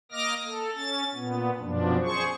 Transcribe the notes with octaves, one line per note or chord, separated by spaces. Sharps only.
A#3 D#5 D6 F6 A#6
A4
C#4 A6
A#2 B3
F#2 B2 F3 D4
G#4 C5 C#6